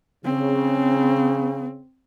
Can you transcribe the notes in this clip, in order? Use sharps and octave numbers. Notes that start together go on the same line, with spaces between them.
C#3 C4